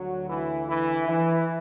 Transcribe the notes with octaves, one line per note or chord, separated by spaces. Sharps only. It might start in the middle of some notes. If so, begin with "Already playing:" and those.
Already playing: D2 D3 F#3 F#4
E3 E4
E3 E4
E3 E4